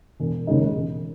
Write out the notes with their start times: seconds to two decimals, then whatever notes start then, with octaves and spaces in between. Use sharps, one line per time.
0.20 E1
0.47 D#2 C#3 G#3 D#4
0.75 E1